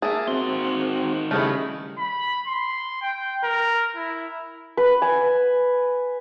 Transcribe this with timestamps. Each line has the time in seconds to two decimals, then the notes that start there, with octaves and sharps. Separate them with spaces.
0.02 A#3 G#4 E5 A5
0.28 D#3 C4 F#4 C6
1.31 C#3 G3 A3 D#4 E4 F6
1.98 B5
2.48 C6
3.02 G5
3.43 A#4
3.96 E4
4.77 B4
5.02 G#5